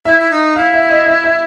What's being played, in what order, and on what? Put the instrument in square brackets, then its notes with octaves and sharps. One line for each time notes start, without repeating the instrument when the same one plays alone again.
[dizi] E4 [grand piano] E5
[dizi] E4
D#4
[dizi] E4 [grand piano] F5
[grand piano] E5
D#5
E5
E5